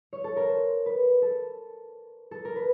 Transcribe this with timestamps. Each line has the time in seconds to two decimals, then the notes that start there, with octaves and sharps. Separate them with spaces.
0.13 C#5
0.24 A4
0.36 A#4
0.49 C5
0.86 B4
1.22 A4
2.31 A4
2.45 A#4
2.56 B4